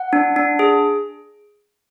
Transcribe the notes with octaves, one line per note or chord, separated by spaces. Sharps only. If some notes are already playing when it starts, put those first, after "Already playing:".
Already playing: F#5
D4
D4
G#4